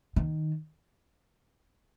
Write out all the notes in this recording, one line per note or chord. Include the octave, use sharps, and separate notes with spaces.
D#3